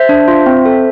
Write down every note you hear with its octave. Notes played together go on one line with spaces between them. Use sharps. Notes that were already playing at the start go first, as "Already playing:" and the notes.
Already playing: C5 E5
D4
F4
C4
A4